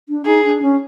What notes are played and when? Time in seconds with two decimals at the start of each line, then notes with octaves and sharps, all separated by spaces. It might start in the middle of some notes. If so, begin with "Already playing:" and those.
0.09 D4
0.25 D#4 G#4
0.44 D4
0.62 C#4